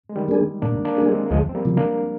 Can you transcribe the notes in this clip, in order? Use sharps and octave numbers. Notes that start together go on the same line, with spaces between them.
G#3
D#3 G3
G3 A#3 D4 G#4
A#2 A#3 D4
A#3 D4
G3 A#3 D4 G#4
G#3 C4
A#3
D2 F3 G#3
C4
G3 A#3
C3 F3
A#3 D4